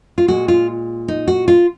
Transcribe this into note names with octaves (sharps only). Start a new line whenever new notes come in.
F4
A#2 G#3 F#4
F4
D#4
F#4
F4